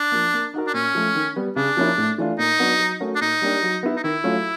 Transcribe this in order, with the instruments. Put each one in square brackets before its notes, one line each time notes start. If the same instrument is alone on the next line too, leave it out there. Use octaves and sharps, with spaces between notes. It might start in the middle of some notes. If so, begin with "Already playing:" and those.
Already playing: [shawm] D4
[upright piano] F3 A#3
A#3
D#4 F#4 A#4
[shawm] D4
[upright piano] A#2 [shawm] C#4
[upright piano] F3 A3
D#3
G3 B3
[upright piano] C#3 [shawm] D4
[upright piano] F3 A#3 C#4 E4
A2
E3 A3 D4 F4
[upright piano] A#2 [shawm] D#4
[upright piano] F#3 B3 D4 F#4
F#3
A3 C#4 F#4 A#4
[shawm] D4
[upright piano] A#2 [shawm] D#4
[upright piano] G3 A#3 D4 G4
F#3
B3 E4
[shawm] D#4
[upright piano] D#3 [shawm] E4
[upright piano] F#3 A3 C#4 F4